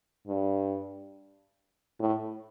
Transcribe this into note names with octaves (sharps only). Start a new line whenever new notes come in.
G2
A2